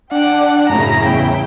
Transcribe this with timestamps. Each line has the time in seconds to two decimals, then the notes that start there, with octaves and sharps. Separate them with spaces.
0.12 D4 F#5 G5 D6
0.70 F#2 A2 C#3 E4 A#5
1.05 E2 G5